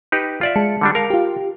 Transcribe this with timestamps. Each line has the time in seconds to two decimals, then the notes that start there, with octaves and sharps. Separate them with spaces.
0.12 D#4 G4 B4
0.41 F4 D5 E5
0.56 G#3 A5 C#7
0.81 D3 G3 D4
0.95 A#4 F5
1.10 F4 G4